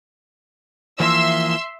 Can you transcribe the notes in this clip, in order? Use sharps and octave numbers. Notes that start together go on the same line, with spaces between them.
E3 F3 A#3 E5 C6 E6